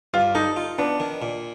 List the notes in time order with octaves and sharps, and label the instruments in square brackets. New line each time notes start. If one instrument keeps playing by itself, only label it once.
[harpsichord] G2 [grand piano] F4
[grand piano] D#4 [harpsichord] A4
[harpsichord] F4
[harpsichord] B3 [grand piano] D4
[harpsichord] D#3
A#2